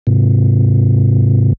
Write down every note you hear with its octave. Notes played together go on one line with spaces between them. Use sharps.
G#2 C3